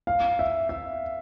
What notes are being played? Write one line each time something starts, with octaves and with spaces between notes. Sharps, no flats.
F5
E5
E5